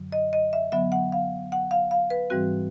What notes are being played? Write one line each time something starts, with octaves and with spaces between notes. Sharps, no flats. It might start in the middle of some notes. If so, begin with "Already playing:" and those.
Already playing: F#2 D3 F#3
D#5
D#5
E5
D3 F#3 B3 E5
F#5
F5
F#5
F5
F5
B4
G#2 E3 G3 C4 F#4